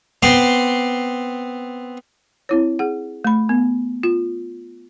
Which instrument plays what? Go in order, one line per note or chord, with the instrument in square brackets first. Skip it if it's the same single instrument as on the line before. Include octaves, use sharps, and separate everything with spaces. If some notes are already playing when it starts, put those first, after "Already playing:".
[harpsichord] B3 C4 C6 D6
[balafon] C4 E4 C#5
G#4 F#5
A3 B5
B3
F4